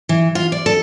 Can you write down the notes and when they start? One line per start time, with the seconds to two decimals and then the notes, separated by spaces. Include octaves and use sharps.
0.09 E3
0.35 F4
0.52 D5
0.66 A4